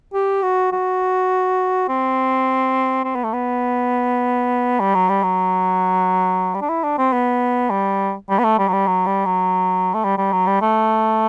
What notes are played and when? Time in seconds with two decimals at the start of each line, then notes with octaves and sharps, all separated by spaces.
0.13 G4
0.42 F#4
0.72 F#4
1.89 C4
3.04 C4
3.15 B3
3.24 A3
3.33 B3
4.80 G3
4.95 F#3
5.09 G3
5.23 F#3
6.54 G3
6.61 D4
6.69 E4
6.84 D4
6.98 C4
7.13 B3
7.70 G3
8.29 G3
8.39 B3
8.44 A3
8.59 G3
8.68 F#3
8.73 G3
8.87 F#3
9.06 G3
9.25 F#3
9.94 A3
10.04 G3
10.18 G3
10.32 F#3
10.47 G3
10.61 A3